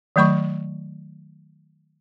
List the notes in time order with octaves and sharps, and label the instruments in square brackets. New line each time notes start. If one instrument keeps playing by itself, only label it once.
[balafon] D#3 F#3 A3 B5 C#6